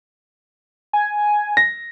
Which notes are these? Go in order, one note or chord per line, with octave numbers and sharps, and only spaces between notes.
G#5
A#6